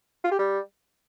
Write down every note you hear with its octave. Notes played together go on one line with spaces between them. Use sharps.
F4
G4
G3